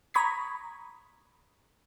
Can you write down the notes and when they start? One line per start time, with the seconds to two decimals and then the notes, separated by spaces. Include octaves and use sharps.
0.14 A#5 B5 C#6 D#6 G#6 B6